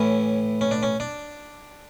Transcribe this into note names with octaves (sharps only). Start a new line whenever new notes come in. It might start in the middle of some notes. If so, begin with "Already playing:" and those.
Already playing: A2 E3 C#4
C#4
D4
C#4
D4